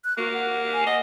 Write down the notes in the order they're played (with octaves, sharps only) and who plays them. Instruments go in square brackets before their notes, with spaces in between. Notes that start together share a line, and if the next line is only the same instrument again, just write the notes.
[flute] F#6
[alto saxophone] A#3 [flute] F#4
[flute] F#5
G#5
[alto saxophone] D#5 [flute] F#5